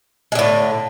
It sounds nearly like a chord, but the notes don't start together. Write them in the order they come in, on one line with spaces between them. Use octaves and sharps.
G#3 D3 A2